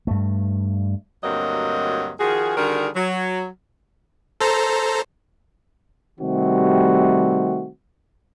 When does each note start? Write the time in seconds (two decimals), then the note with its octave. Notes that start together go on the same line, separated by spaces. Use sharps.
0.07 G2 A3
1.23 D2 G2 F#3 A#3 C4 D#5
2.19 D#3 F3 F#4 G#4
2.57 D3 D#3 G3 F#4 G#4 A#4
2.95 F#3
4.41 A4 C5 A#5
6.20 C3 D#3 G3 A3 C4 F#4